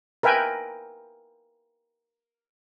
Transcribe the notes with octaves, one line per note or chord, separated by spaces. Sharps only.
A#4 B4 E5 G5 G#5